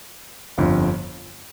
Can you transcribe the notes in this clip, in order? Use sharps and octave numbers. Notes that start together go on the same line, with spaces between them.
G1 F2 D3